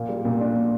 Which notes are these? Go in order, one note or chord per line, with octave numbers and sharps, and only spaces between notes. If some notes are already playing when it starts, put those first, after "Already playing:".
Already playing: A#2 A#3
G3
A#2
D4
A#2